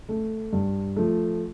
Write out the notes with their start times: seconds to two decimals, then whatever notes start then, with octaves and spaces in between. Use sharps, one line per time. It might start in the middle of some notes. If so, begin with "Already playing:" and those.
0.09 A3
0.53 G2
0.96 F3 A3